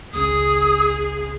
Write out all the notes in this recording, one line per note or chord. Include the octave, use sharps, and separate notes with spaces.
G#1 C#2 C#3 G#4 D#6